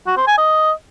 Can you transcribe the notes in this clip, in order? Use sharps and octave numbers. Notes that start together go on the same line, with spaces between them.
F#4
C5
G#5
D#5